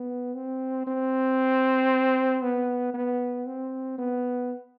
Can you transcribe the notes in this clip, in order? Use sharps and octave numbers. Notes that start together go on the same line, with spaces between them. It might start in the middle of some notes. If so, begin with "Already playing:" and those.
Already playing: B3
C4
C4
B3
B3
C4
B3